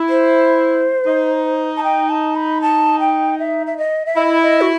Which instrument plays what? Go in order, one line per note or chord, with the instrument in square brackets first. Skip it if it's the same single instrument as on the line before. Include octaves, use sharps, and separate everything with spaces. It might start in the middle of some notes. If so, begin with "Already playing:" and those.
Already playing: [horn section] E4
[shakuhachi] C5
[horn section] D#4
[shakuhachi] A5
G5
A5
B5
A5
G5
E5
E5
D#5
E5
[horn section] E4 [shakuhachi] D#5
[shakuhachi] D#5
F#4